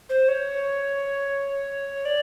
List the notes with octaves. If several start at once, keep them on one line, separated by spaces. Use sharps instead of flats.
C5
C#5
D5